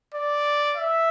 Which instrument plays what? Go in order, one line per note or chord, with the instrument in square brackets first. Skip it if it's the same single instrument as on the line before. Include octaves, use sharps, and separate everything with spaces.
[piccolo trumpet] D5
E5